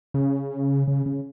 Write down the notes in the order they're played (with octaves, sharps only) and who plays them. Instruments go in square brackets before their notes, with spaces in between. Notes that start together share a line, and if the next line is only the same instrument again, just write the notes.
[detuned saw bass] C#3
C#3
C#3